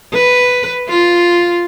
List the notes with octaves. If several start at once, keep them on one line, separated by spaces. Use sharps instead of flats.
B4
F4